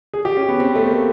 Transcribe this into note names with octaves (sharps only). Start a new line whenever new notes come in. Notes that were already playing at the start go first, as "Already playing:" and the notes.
G#4
G4
C#4
B3
C4
A3
A#3